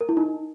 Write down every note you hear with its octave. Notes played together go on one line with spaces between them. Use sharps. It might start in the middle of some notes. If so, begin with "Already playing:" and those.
A#4
E4
D#4